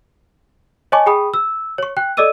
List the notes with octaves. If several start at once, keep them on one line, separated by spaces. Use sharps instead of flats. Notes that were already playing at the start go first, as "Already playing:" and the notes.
C#5 D#5 G#5 A5 C#6 D6
G#4 G5 B5 D#6
E6
C#5 C#6
G5 F#6
A4 D5 D#5 D6 E6 D#7